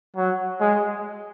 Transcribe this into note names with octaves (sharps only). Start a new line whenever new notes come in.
F#3
G#3